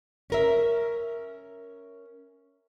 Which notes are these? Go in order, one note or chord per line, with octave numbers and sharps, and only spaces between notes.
C#4 A#4 E5